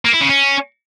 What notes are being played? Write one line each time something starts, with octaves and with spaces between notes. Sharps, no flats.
A#3
E4
C#3
C#4